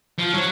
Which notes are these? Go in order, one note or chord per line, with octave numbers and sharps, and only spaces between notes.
F3
F#3